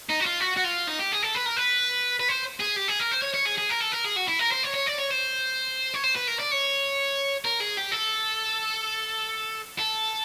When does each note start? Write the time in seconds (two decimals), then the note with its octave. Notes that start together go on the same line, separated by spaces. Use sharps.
0.10 D#4
0.20 F#4
0.26 F4
0.40 F#4
0.57 F#4
0.64 F4
0.87 D#4
0.99 G4
1.12 G#4
1.22 A4
1.35 B4
1.46 A#4
1.57 B4
2.19 B4
2.28 C5
2.60 G#4
2.76 G4
2.88 G#4
3.00 A#4
3.11 C5
3.22 C#5
3.34 C#5
3.46 G#4
3.58 G#4
3.70 A#4
3.81 A4
3.92 A#4
4.05 G#4
4.16 F#4
4.28 E4
4.39 A#4
4.52 C5
4.64 C#5
4.75 C#5
4.87 D5
4.99 C#5
5.11 C5
5.94 C#5
6.04 C5
6.16 B4
6.28 A#4
6.39 D5
6.52 C#5
7.45 A#4
7.60 G#4
7.77 G4
7.91 A4
9.79 A4